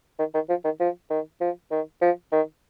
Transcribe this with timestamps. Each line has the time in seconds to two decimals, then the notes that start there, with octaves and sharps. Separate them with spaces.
0.19 D#3
0.34 D#3
0.49 F3
0.64 D#3
0.80 F3
1.10 D#3
1.41 F3
1.71 D#3
2.01 F3
2.32 D#3